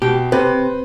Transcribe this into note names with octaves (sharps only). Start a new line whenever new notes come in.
B2 G4
C3 B4 C5